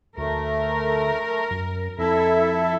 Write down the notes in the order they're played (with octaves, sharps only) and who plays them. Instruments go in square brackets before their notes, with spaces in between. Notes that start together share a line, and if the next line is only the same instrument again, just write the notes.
[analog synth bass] D2 [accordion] A3 [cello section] A#4
[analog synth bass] F#2
[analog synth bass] F2 [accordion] E4 E5 [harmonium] A4